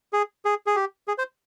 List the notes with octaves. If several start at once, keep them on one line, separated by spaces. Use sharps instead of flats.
G#4
G#4
G#4
G4
G#4
C5